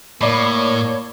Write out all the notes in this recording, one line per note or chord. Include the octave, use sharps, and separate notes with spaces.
A2 A#3 C#5 D5 B5